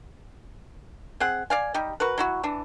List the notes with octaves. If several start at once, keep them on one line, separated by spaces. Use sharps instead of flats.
C4 G#4 F#5
D5 F5 G#5
G3 D#4 G4
F#4 A#4 B4
F#3 E4 F#4
E3 D4